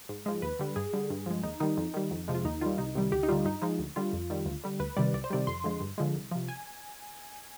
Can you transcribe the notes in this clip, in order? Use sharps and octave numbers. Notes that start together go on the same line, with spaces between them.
G#2
F3 G#3
D#2 B4
D3 G3
G2 G#4
D3 G3
G2
F3 G#3
D#2 D#4
D#3 G3 D#4
F2
D#3 G3
F2
C3 F3 G#3
F4
D#2 D#4
D#3 G3 F4
C2 D#4
C3 D#3 G3
D2 G4
D#4
D3 G3 F4
G2 D#4
F3 G#3 D#4
D2
D3 G3 F4
F2
D#3 G3
D2
D3 G3
D2 B4
C3 D#3 G3 D5
C2 D5
C5
C3 D#3 G3 D5
F2 C6
D3 F3 G#3
G2
D3 F3 G#3
C2
C3 F3
G#5